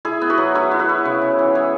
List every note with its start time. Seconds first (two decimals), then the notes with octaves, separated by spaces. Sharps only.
0.05 E4 G#4
0.21 B3
0.30 F#4 B4
0.38 F#3
0.55 E4 F#4 B4
0.71 E4
0.79 F#4 B4
0.89 E4
1.05 C#3
1.22 C#3
1.39 E3
1.55 E4 G#4 C#5